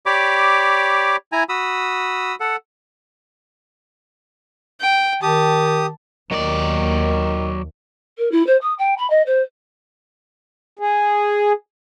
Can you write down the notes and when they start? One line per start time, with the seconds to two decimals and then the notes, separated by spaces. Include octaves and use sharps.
0.06 G4 C#5 D5 B5 D6
1.32 E4 G#5 A#5
1.49 F#4 B5 D#6 E6
2.40 A4 F#5
4.81 G5
5.22 D#3 G4 A5 D#6
6.31 D#2 D#3 F#3 D5
8.18 A#4
8.31 E4
8.46 C5
8.61 D#6
8.78 G5
8.97 B5
9.10 D#5
9.26 C5
10.79 G#4